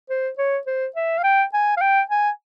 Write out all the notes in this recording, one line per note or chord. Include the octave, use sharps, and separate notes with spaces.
C5
C#5
C5
E5
F5
G5
G#5
F5
G5
G#5